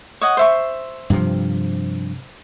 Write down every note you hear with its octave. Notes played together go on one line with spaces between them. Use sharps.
C#5 D#5 F#5
C5 E5 C#6
G2 C3 F3